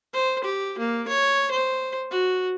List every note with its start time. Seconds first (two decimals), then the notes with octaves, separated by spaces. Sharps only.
0.13 C5
0.44 G4
0.78 A#3
1.07 C#5
1.51 C5
2.11 F#4